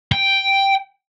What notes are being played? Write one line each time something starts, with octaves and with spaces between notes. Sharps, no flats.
G5